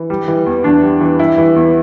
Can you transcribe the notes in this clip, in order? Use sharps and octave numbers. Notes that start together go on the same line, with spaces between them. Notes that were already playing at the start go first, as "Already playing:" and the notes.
Already playing: E3
G3
E3
E2
E2 D4
G3
E3
G3 E4
E3
E2